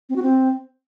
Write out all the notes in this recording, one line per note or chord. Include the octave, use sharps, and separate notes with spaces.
C4
F#4
C4